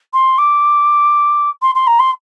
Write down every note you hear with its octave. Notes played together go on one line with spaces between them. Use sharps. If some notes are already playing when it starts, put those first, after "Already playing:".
C6
D6
C6
C6
A#5
C6